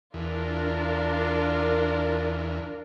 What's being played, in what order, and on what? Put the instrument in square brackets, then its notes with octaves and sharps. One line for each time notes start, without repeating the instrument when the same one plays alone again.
[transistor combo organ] E2 [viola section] D4 F4 A#4